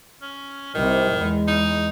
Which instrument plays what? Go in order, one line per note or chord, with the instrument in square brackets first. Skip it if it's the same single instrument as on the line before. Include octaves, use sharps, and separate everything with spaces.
[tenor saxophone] C#4
[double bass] C2 C3 [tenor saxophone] D#3
[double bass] E2 G#3
[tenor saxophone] D#4